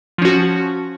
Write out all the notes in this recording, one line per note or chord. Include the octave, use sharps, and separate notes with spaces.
F3 C#4 F#4